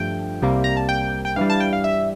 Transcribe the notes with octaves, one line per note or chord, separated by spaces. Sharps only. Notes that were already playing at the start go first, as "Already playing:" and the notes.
Already playing: G2 F3 A3 G5
C2 C3 G3 A#3
A#5
A5
G5
G5
G2 E3 G3 F5
A5
G5
F5
E5